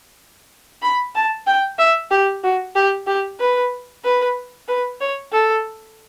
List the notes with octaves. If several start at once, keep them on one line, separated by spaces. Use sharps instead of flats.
B5
A5
G5
E5
G4
F#4
G4
G4
B4
B4
B4
C#5
A4